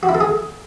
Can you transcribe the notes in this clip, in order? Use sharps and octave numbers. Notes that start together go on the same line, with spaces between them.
F#4
E4
A4
G#4